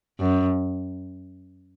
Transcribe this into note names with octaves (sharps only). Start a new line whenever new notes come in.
F#2